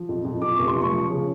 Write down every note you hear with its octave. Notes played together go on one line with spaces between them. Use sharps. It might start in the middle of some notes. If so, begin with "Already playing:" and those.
Already playing: F3
F2
F2
F2 D6
F1 C#6
C6
F3
C#6
F3
C#3